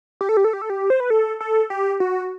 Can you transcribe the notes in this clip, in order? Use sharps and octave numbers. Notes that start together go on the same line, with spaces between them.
G4
A4
G4
A4
G4
A4
G4
C5
B4
A4
A4
G4
F#4